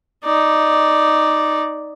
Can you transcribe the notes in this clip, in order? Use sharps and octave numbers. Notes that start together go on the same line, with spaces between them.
D#4 D5